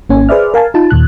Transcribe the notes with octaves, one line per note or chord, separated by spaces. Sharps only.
G#1 A#3 C#4 G#5
G#4 B4 C5 D5 E5 F6
A#4 F5 G#5 A5
D#4 F4 A5
D#2 A#2 F#6